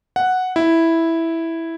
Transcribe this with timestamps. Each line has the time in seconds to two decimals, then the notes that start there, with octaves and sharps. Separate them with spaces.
0.16 F#5
0.56 E4